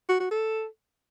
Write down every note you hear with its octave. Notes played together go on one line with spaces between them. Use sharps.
F#4
F#4
A4